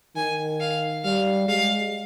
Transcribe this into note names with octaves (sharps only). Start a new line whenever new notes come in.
D#3 G#5
F5
G3 F5
G#3 F5